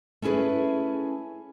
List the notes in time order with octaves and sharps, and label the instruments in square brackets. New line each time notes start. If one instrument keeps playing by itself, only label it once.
[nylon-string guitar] A3 C#4 E4 G#4 B4